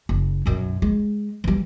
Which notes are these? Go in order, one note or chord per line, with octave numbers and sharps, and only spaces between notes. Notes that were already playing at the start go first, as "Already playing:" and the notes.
F#1
B1 F#2
G#3
E3 G3